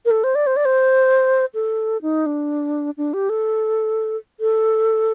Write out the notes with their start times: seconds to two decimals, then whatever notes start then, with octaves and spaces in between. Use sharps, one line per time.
0.05 A#4
0.11 A4
0.24 C5
0.35 D5
0.47 C5
0.56 D5
0.65 C5
1.55 A4
2.02 D#4
2.26 D4
2.97 D4
3.14 G4
3.29 A4
4.40 A4